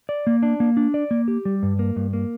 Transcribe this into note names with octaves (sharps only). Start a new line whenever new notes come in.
D5
A#3
D4
A#3
D4
D5
A#3
G4
G3
G2
A#3
G2
A#3